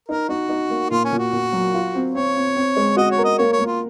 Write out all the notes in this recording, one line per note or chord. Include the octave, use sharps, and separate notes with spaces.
D#4 A#4
D#4 F#4
D#4
A#3
A#2 F4
C#4
A#2
F#4
A#2
F#3
F4
C4
C4 C#5
C4
C4
G#3
F#4 D#5
C#5
A#4
D#5
A#3 C#5
C#5
A#3
F4